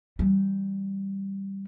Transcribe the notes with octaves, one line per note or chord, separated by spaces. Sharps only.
E3 G3